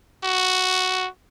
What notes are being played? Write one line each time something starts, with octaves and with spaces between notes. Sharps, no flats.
F#4